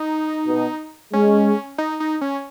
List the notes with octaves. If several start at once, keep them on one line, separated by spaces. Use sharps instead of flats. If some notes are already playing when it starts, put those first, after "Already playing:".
Already playing: D#4
B2
G#3 C#4
D#4
D#4
C#4